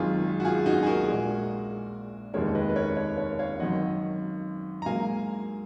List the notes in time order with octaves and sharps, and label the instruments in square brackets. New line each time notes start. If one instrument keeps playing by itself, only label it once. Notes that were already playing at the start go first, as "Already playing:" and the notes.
Already playing: [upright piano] G#1 F#2 D#3 G#3 [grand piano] F4 G#4
[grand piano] F#4
F4 G#4
D#4 F#4
G#4
F#4 A#4
[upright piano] A#1 A#2 G#3
[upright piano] F1 D#2 D#3 G#3 [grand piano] A#4 C#5
[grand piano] B4 D#5
B4
A#4 C#5
A#4 C#5
A#4 C#5
C#5 F5
[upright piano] G#1 F#2 D#3 [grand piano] D#5 F#5
[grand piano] A#5
[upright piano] G#2 F#3 A#3 [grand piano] F5 G#5